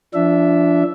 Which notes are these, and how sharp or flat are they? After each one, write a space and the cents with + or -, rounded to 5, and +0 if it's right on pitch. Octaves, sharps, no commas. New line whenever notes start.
F3 -20 D4 -15 E5 +5